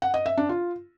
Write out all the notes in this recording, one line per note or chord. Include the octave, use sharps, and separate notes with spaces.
F#5
D#5
E5
D4
F4